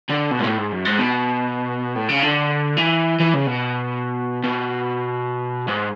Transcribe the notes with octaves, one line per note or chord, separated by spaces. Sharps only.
D3
B2
G#2
A2
G#2
F#2
G#2
B2
A2
C#3
D3
E3
E3
C#3
B2
B2
G#2